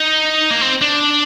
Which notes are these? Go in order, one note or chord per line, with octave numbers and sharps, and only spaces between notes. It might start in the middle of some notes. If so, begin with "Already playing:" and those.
Already playing: D#4
A#3
C4
D4